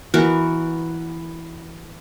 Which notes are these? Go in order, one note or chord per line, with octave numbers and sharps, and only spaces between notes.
E3 B3 F#4 A#4